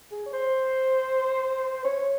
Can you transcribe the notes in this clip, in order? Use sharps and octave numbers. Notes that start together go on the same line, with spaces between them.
G#4
C#5
C5
C#5